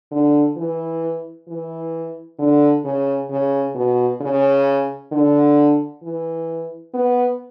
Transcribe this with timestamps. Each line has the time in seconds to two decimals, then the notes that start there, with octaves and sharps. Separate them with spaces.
0.11 D3
0.56 E3
1.48 E3
2.39 D3
2.85 C#3
3.30 C#3
3.75 B2
4.21 C#3
5.12 D3
6.03 E3
6.94 B3